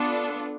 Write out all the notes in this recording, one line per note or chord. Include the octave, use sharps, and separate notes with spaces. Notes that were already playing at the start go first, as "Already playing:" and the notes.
Already playing: B3 D4 F4 A4